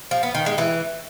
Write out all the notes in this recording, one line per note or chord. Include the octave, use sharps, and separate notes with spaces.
F3
B3
D#3
G#3
E3